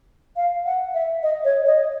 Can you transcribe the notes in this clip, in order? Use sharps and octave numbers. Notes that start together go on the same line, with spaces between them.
F5
F#5
E5
D#5
C#5
D#5